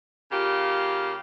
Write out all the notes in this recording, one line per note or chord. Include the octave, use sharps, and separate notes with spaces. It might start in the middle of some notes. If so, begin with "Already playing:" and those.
C#3 A#3 F4 G4